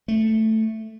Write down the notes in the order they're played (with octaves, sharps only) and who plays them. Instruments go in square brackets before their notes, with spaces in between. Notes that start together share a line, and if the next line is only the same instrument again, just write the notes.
[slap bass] A3